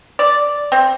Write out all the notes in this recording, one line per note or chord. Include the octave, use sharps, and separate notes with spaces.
D5
C4